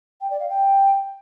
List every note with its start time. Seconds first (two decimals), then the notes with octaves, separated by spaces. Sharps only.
0.21 G5
0.30 D5
0.40 F5
0.49 G5